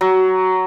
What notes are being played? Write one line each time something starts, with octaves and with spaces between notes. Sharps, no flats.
F#3